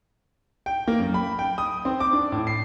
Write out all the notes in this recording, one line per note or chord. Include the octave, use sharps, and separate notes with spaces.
G5
A#3
F#2
B5
G5
D#6
C4
D6
D4
A2
C7